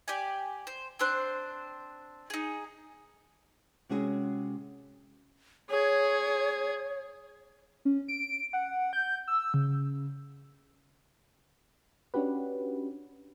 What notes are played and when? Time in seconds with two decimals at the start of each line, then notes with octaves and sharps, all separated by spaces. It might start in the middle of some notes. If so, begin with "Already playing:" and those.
0.08 G4 D5 G#5
0.67 C5
0.99 C4 D4 C5 F#6
2.30 D#4 G#4
3.89 C3 G#3 C#4 F#4 G#4
5.71 G#4 C#5
7.85 C#4
8.08 D7
8.53 F#5
8.93 G6
9.28 E6
9.54 C#3
12.14 C#4 D4 F#4 G4 B4